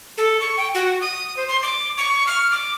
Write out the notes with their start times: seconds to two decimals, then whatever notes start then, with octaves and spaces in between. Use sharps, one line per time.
0.18 A4
0.41 C#6
0.57 G5
0.75 F#4
1.01 D#6
1.37 C5
1.48 C6
1.63 D6
1.98 C#6
2.27 F6
2.51 D6